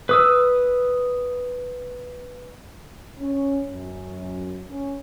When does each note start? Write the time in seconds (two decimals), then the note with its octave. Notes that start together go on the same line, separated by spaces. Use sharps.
0.09 B4 D#6 E6
3.17 C#4
3.69 F#2
4.69 C#4